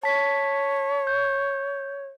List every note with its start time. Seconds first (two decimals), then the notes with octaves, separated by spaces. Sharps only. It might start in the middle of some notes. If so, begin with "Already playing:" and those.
0.03 C#5 A5 B6
1.07 G6